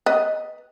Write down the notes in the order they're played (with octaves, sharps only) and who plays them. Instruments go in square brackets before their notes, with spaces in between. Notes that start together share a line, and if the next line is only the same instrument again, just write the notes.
[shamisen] B4 D#5